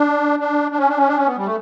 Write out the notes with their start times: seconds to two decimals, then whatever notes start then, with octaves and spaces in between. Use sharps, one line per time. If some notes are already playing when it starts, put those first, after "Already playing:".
Already playing: D4
0.40 D4
0.71 D4
0.78 C#4
0.88 D4
0.98 C#4
1.07 D4
1.17 C#4
1.26 B3
1.37 G3
1.46 A3